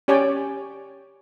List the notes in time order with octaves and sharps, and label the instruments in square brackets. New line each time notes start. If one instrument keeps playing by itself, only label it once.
[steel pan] C#4 G4 C#5 D5 G5 G#5